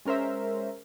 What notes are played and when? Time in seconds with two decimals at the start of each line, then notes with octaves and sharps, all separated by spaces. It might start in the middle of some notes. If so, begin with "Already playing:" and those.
0.05 G#3 C#4 A#4 C5 E5